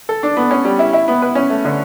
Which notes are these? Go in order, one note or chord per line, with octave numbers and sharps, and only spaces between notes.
A4
D4
B3
C#4
G3
E4
E4
B3
B4
C#4
A3
D3